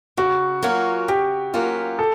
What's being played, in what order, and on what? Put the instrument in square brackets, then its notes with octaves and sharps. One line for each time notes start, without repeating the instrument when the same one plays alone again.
[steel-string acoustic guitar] C#3 [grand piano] F#4
[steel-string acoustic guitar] F#3 A#3 C#4 F4
[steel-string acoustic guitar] C#3 [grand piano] G4
[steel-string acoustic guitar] F#3 A#3 C#4 F4
[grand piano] A4